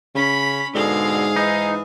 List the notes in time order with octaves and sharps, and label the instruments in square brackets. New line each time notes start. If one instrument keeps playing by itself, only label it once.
[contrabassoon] C#3 [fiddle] C#4 B5
[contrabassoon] G#2 [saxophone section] B2 D3 [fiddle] G#4 F5
[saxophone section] E3 D#5 [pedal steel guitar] D#4